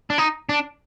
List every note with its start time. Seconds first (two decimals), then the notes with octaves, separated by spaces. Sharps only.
0.10 D4
0.18 D#4
0.49 D4